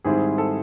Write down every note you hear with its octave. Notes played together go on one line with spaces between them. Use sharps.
G#2 D#3 G3 C4 E4 G#4
A4